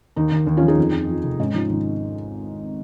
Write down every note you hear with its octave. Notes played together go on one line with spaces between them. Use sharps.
D#2 D#4
D#2
D#2
C#4 F4
F3
D#4 G#4
F2
F2
F3
F1
G#2 C#4
F3 D#4
G#1 D#4